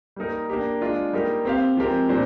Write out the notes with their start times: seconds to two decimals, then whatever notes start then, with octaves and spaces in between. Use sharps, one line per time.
0.16 G3 A#3 D#4 A#4
0.50 A#3 D4 G4
0.81 G#3 D4 F4
1.13 G3 A#3 D#4 G4 A#4
1.45 C4 G4 C5 F5
1.77 F3 G#3 C4 G4 A#4
2.09 A#2 G3 D4 C5